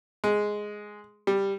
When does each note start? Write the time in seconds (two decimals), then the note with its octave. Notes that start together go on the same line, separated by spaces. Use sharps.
0.24 G#3
1.27 G3